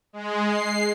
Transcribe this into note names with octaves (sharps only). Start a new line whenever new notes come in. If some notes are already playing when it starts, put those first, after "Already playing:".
G#3
C7